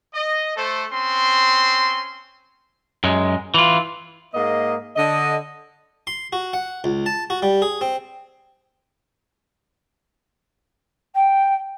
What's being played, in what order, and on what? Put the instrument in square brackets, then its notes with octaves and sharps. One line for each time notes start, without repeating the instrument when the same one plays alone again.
[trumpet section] D#5
A3 A4 C5
C4 C#4 C6
[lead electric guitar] F#2 G#3
E3 F4
[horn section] G#2 A#3 D#5
D3 D#5
[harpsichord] C6
F#4
F#5
C#2
A5
F#4
G3
G#4
C4
[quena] G5